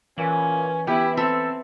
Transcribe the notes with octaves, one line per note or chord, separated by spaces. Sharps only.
A#2 E3 C#4
B3 E4 G4
C4 A4 E5